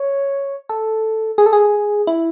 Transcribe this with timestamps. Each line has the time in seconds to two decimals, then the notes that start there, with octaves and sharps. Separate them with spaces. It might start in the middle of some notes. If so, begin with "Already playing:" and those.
Already playing: C#5
0.69 A4
1.38 G#4
1.46 A4
1.53 G#4
2.07 E4